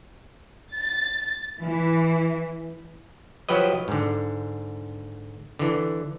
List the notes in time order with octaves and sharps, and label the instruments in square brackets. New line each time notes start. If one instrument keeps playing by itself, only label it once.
[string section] A6
E3
[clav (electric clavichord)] F3 F#3 G4 B4 D#5
G#2 D3
D3 E3